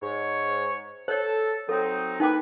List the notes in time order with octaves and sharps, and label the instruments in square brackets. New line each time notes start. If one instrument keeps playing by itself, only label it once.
[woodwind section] G#2 C#5
[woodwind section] A4 [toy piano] C5 C#5
[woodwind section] F#3 C4 D#4 [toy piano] A4
[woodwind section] A#3 B4 [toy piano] D#4 G5 D6